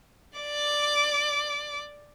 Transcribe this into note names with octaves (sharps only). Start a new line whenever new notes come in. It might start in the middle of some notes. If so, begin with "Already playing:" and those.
D5 D6